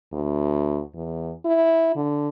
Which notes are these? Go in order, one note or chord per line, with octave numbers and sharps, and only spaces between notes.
D2
E2
E4
D3